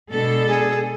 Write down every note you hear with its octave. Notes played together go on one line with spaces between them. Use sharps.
B2 G#3 B3 D4 A4
G#4